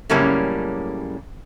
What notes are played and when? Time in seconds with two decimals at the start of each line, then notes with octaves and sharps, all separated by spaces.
0.09 F#2 A2 C#3 G3 A#3 C#4